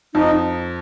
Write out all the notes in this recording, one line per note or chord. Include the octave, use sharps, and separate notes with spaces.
F2 D#4